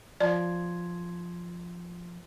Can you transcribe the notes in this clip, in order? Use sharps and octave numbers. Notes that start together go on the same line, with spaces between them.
F3 D5 C6 G#6